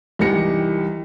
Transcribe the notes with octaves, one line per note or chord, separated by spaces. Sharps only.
C2 D#3 E3 G4 A#6 C#7